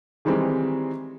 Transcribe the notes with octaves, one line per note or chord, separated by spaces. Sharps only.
D#3 E3 G3 G#3 C4